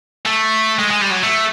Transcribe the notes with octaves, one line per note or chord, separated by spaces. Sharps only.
A3
G#3
G#3
G3
F#3
A3